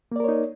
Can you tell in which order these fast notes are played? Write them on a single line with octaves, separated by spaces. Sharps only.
A#3 D5 A#4 C#5 D#4